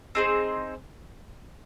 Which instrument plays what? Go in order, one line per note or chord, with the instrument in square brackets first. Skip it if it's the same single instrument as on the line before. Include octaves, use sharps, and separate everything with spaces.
[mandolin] C4 D#4 G#4 C5